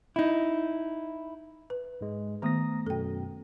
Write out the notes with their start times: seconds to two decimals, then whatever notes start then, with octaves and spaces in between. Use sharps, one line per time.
0.16 D#4 E4
1.70 B4
2.01 G#2 G#3
2.42 D#3 A3 B3 A#5 D#6 A#6
2.87 F#2 B2 A4 G5